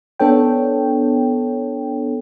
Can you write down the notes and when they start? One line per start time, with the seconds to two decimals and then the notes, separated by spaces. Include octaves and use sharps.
0.19 B3 D4 A4 C#5 G5